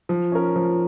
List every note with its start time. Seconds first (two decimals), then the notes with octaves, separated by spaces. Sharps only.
0.09 F3
0.32 C#4 A#4
0.56 F3